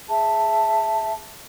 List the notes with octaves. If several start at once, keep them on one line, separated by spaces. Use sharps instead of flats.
G#4 E5 A5